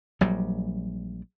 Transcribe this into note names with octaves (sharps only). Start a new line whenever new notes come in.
A#1 F#3 G3